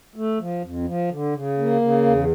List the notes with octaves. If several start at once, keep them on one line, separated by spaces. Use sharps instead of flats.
A3
F3
F2
F3
D3
C#3
A#3
C#3
E2